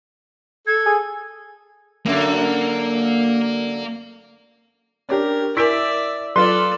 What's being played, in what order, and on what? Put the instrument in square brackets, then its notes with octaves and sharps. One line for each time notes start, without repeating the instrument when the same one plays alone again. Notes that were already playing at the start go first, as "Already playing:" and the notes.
[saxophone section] A4 [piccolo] G#6
[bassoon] G#4
[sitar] F#2 D3 [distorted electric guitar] A#3
[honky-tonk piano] C#4 D4 G4 [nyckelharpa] A#4
[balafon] E4 A#4 G#5 [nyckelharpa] D5 E5 [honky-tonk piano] E6 B6 D7
[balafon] F#3 [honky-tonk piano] F4 B4 [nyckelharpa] A4 D5 [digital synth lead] C6